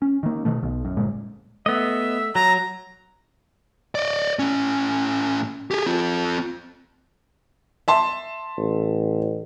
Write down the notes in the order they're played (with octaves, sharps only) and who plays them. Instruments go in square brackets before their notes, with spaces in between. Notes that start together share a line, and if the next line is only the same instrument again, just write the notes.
[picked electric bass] C#4
D#3 A#3
B2 D#3 A3
B1 B2
F#2
G1 A#2 G#3
[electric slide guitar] A3 [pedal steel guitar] B3 D#5 [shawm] E5
[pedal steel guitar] F#3 [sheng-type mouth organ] A#5
[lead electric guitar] D5 D#5
A2 C#4
G4 G#4
C4 F4
[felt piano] E5 A5 C6
[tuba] A1